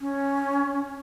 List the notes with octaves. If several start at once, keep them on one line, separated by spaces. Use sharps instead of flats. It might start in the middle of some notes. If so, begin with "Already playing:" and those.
C#4